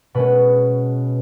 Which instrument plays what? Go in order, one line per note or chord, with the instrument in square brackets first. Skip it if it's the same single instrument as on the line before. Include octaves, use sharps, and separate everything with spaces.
[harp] B2 G#3 C#4 B4